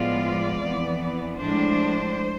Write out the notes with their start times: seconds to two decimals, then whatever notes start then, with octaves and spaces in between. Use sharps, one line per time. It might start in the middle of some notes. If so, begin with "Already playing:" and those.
Already playing: A2 F3 G#3 B3 F4 D5
0.62 F2 E3 B3
1.39 A2 F3 G#3 D4 C5